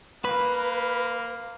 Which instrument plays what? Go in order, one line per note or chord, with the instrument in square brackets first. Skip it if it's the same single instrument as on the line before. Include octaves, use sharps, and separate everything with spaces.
[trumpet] A#3 [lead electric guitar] B4